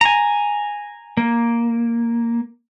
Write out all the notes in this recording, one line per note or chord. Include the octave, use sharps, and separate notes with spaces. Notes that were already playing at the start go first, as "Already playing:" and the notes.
G#5 A#5
A#3